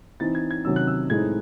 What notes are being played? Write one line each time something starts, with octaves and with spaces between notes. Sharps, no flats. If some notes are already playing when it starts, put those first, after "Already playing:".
E3 C4 D#4 A6
G#6
G#6
C3 D#3 F#3 C#4 E6
F#6
E6
A2 G#3 C4 D#4 G#6